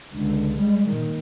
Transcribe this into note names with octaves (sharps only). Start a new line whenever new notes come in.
C#2 D3
G3 G#3
A#2 D#3